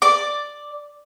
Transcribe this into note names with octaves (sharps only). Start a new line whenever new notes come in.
D5 D6